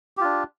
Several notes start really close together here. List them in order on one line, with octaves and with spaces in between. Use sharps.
G4 F4 D4